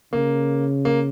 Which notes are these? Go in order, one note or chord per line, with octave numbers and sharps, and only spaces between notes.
C#3 A#3
A#3